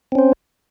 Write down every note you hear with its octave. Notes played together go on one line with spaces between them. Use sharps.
C4 C#4 C5